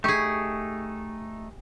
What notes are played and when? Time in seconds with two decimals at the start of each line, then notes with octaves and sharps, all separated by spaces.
0.04 A3 D#4 G4 G#4 C#6